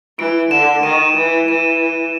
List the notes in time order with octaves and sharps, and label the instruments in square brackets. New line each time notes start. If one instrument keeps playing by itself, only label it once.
[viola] E3 [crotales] D7
[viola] D3 [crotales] E7
[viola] D#3 [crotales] D#7
[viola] E3
[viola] E3 [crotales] D#7